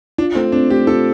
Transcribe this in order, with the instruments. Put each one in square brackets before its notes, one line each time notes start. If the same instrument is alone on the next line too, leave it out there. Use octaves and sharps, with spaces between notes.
[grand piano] D4 [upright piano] F4
[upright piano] A3 [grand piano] C4
[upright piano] C4 [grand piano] D4
[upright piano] A3 [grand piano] G4
[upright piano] F4 [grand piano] A4